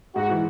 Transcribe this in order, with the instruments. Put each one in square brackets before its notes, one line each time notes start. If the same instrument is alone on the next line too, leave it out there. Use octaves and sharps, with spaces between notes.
[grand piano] G#2 [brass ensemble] F#4
[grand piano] E3